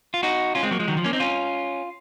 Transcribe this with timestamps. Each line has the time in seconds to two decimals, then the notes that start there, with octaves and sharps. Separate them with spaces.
0.14 F4
0.23 D#4 F#4
0.55 C#4 F4
0.63 G#3 C4
0.71 F#3 A#3
0.79 F3 G#3
0.88 D#3 F#3
0.97 F3
1.04 A#3 C#4
1.13 C4 D#4
1.20 C#4 F4